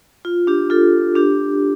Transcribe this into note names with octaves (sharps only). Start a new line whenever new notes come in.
F4
D4 G4
F4 A4
D4 G4